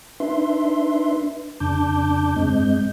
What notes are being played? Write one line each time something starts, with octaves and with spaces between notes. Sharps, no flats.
D4 D#4 B4 E5 C6
F2 C#3 D4 A5 D6 G6
G2 G#3 C4 D#5 G6